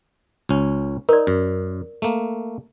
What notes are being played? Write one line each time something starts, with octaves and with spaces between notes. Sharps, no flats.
C#2 C#4
D#4 A#4 D5
F#2
A3 A#3